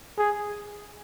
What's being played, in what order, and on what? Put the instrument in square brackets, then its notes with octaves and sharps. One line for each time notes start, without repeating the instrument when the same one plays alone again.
[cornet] G#4